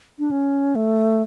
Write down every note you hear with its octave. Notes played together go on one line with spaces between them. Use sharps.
D4
C#4
A3